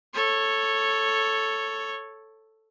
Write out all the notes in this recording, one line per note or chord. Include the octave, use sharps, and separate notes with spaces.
A4 C#5